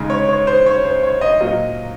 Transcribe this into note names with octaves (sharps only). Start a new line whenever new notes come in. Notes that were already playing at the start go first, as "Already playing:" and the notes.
Already playing: C#3 G#3 D#4
C#5
C#5
C5
C#5
C5
C#5
D#5
A#2 F#3 A#3 D#5